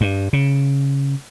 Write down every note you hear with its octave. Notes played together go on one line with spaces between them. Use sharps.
G2
C#3